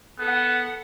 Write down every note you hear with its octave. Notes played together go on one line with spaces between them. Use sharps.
B3 A4 F#5